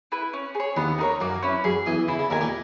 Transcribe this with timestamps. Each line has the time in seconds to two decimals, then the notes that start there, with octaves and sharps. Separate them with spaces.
0.12 E4 B4
0.33 C#4
0.55 G#4 C#5
0.77 D#2 D#3 B3
0.98 D#4 A#4 C#5
1.20 F#2 F#3 A#3
1.43 C#4 E4 B4
1.64 F#2 F#3 G#4
1.86 E2 E3 D#5 G#5
2.08 C#3 E4
2.19 C#3
2.30 D#2 D#3 A#4 C#5 G#5
2.41 A#2 A#3